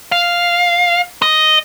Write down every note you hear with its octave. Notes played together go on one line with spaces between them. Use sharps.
F5
D#5